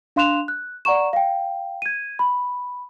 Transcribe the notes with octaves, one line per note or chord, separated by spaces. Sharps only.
D4 F5 C6 F#6 E7 F7
F#6
D5 F#5 A#5 C#6 E7
F5 G5
G#6 D#7
B5